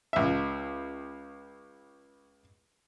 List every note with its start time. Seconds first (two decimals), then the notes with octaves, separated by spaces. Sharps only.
0.13 C#2 E5